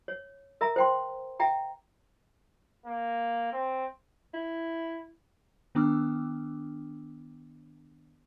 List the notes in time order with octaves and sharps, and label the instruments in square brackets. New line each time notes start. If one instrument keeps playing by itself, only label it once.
[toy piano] C#5
A#4 E5 A#5
C5 G5 C6
E5 G5 A#5
[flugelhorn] A#3
C4
[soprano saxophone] E4
[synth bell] D#3 B3 D4 D6 E6 F6